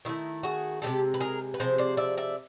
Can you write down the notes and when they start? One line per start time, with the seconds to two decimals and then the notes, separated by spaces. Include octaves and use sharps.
0.05 D#3 F#3 A3 E4
0.43 F#4 G#4
0.82 F3 G#3 G4 A4
0.87 C3
1.14 B4
1.20 G#4 A#4
1.54 B4
1.60 C3 F3 G#3 C5
1.78 C5 D5
1.97 D5 E5
2.17 D5 E5